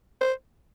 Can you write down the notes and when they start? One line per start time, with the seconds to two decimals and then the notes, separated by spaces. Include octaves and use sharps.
0.21 C5